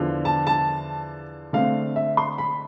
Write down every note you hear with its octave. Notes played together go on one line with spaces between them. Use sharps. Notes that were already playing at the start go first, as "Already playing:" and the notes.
Already playing: E2 D3 F3
A5
A5
D3 A3 C4 F5
E5
C6
B5